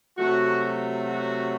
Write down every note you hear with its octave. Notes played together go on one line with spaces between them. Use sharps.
C3 F#3 A3 F#4
F#4